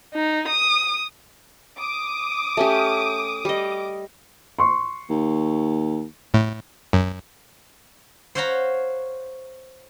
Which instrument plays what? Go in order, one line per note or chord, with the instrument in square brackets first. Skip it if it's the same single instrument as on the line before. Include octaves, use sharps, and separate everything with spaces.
[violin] D#4
D#6
[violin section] D6 D#6
[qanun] A3 C#4 G4
G3 D#5
[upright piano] C6 C#6
[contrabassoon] D#2
[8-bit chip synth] A2
F#2
[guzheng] C5 C#5 F5 F#5 A#5 B5